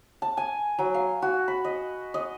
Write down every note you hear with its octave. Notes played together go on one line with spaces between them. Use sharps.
A5
G#5
F#3
F5
F#4
B5
D#5
D#5